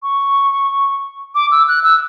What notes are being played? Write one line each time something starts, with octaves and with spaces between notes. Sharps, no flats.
C#6
D6
E6
F#6
E6